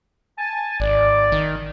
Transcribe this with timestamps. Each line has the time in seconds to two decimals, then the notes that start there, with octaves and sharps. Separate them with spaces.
0.38 G#5 A5
0.80 G#1 D5
1.32 D#3